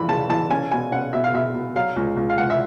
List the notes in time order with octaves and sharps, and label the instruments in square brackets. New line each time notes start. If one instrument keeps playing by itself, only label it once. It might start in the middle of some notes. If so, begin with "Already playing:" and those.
Already playing: [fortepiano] F2 E3 B5
C#3 A5
E3 A5
C#4 G#5
B2 G#5
C#4 F#5
B2 E5
F5
B2 E5
B2
F#3 F5
C#2
C#2
F5
C#2 F#5
E5